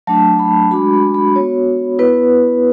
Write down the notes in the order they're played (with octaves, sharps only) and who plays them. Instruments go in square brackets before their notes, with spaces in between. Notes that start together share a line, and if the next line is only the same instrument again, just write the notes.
[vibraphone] F#3 A3 D4 A5
B5
G#3 D4 F#4 B5
B5
B5
B3 F#4 C#5
B3 E4 B4